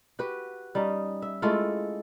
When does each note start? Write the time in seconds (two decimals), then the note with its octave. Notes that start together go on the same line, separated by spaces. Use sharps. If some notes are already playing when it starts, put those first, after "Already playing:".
0.19 F#4 G4 B4
0.75 G3 C#4 D#4
1.22 E5
1.42 G#3 A3 E4 F4